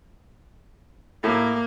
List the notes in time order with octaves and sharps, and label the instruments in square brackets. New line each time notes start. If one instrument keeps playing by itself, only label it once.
[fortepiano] A2 [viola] A#3